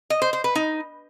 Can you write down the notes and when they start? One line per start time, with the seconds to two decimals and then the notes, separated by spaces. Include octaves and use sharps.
0.10 D#5
0.22 C5
0.33 C5
0.44 B4
0.55 D#4